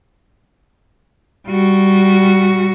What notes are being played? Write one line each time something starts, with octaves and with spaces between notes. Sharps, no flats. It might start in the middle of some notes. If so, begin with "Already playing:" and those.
G3 F#4